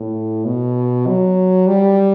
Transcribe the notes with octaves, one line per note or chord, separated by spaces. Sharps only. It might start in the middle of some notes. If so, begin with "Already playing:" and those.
Already playing: A2
B2
F#3
G3